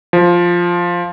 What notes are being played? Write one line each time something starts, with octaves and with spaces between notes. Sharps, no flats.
F3